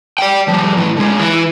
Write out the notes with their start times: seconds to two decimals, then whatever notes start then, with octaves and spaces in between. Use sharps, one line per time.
0.18 D5 G5
0.48 F3 G3
0.77 A2 E3
0.97 D3 G#3
1.19 E3 E4